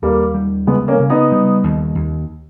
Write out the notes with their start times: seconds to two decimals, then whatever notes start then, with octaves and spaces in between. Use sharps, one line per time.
0.02 D#2 G3 A#3
0.34 G3
0.67 C#3 G#3 B3
0.88 A#3 C#4
1.00 C#3
1.10 B3 D#4
1.32 G3
1.64 D#2
1.95 D#2